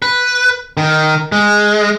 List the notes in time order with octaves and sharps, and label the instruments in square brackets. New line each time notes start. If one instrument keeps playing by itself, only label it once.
[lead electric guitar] B4
D#3
G#3